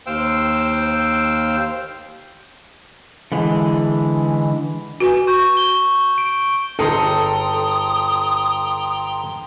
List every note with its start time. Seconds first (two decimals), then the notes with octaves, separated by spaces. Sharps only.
0.06 D#2 C5 F5 G5 E6
3.32 D3 E3 G#3
5.00 F#4 B4 G#5
5.27 C#6 G6
5.57 G7
6.18 D7
6.79 G1 D#4 G#4 A4 G5 A#5 C6 D#6